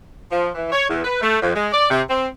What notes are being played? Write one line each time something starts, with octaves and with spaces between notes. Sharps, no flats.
F3
E3
C#5
E2
B4
A3
F2
G#3
D5
C3
C4